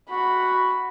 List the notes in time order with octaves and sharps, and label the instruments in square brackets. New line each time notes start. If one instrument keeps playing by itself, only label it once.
[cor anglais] F#4 [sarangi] B5